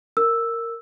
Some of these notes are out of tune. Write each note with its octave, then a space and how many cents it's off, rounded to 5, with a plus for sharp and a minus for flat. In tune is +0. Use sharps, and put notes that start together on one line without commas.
A#4 -10 E6 +0